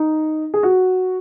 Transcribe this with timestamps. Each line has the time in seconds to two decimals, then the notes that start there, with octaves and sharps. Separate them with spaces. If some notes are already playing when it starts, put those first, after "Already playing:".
Already playing: D#4
0.54 G#4
0.63 F#4